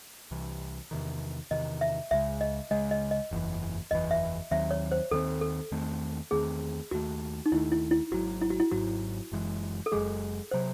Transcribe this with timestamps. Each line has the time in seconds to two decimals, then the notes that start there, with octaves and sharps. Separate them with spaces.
0.31 C2 C3 E3
0.91 E2 C3 D#3
1.51 E2 C3 D#3 D#5
1.81 E5
2.11 C#2 C#3 G#3 E5
2.41 D#5
2.71 C#2 C#3 G#3 D#5
2.91 D#5
3.11 D#5
3.31 F#1 E2 C#3 E3
3.91 F#1 E2 C#3 E3 D#5
4.11 E5
4.51 D#2 D#3 F#3 C4 E5
4.71 C#5
4.92 C5
5.11 D#2 D#3 F#3 C4 A4
5.41 A4
5.71 E2 D#3 A3 C4
6.31 E2 D#3 A3 C4 G#4
6.91 D#2 D#3 A3 F#4
7.46 D#4
7.52 D#2 D#3 A3 E4
7.72 E4
7.91 E4
8.11 G#1 G#2 F#3 F#4
8.41 E4
8.50 F#4
8.60 E4
8.71 G#1 G#2 F#3 F#4
9.32 F#1 F#2 E3 G#3
9.86 A4
9.92 F#1 F#2 E3 G#3 G#4
10.51 C3 F#3 C5